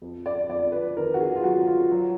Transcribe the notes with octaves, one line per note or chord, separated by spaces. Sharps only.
F2
D5
F2 D5
B4
D#3 A#4
F#4
G#4
F4
F#3 F#4
F4
F#3